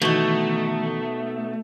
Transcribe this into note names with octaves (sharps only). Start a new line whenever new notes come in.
B2 D#3 E3 A3 D#4 C#6